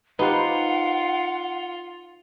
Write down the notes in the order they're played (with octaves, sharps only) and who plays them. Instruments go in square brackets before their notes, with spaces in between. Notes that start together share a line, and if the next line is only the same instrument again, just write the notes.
[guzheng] D#4 C5 [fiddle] F4 [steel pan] G4 B4 [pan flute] F#5